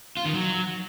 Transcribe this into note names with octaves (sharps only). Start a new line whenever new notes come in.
F4
D#3
F#3